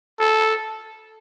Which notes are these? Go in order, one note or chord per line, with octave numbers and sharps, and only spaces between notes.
A4